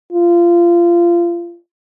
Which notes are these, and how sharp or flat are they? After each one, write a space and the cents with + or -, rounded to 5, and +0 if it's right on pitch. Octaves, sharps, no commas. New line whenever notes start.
F4 -25